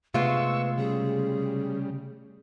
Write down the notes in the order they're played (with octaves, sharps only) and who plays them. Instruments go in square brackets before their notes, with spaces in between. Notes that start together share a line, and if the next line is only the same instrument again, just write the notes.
[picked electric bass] C3 A3 B3 [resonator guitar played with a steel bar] G#3 F4 [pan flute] B4 [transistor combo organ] C#6 E6
[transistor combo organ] C#3 G3 [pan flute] G#4